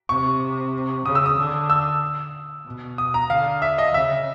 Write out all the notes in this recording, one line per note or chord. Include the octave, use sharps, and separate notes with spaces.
C3 C#6
C#3 D#6
E6
D#6
D3
E6
B2
D#6
A#5
D3 F5
E5
D#5
C#3 E5